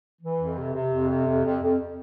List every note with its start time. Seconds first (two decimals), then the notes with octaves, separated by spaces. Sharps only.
0.22 E3
0.39 F2
0.57 C3
0.74 C3
0.92 F2
1.09 C3
1.27 F2
1.45 F2
1.62 F2